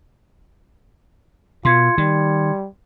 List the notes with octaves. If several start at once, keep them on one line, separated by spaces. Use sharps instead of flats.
B2 F4 C6 G#6 C#7
D#3 G3